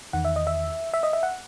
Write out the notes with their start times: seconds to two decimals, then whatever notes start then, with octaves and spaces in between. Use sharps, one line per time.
0.13 E2 D#3 F#5
0.25 E5
0.36 D#5
0.47 E5
0.94 E5
1.03 D#5
1.13 E5
1.23 F#5